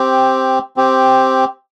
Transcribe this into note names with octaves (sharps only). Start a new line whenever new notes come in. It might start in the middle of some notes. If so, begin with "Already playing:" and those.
Already playing: C4 G4
C4 G4